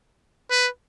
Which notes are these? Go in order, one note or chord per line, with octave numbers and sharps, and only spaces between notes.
B4